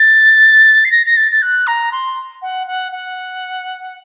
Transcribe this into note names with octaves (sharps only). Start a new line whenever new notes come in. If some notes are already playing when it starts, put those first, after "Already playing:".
Already playing: A6
C7
A#6
A#6
A6
A6
F#6
A#5
C6
F#5
F#5
F#5